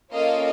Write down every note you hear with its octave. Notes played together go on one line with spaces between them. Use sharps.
A#3 C#4 F4 A4 D#5 F5